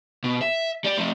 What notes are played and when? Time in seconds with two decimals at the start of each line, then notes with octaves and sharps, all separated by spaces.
0.24 B2
0.41 E5
0.84 G3 D5
0.98 F3 A3